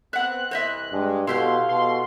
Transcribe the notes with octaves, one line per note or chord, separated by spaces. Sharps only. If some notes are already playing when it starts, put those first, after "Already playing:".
B3 C4 E5 F#5 F#6
C2 E3 C5 D#5 E5
G2 G#3
B2 E4 G4 A4 B4 F5 C6
B2 C6